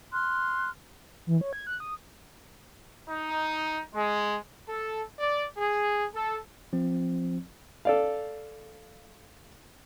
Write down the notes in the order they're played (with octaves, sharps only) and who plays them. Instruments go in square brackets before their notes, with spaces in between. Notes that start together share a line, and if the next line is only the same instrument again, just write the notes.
[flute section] C6 F6 F#6
[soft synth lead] E3
C#5
G#6
F#6
D#6
[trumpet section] D#4
G#3
A4
D5
G#4
A4
[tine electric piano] F3 C4
[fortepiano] A4 D5 F5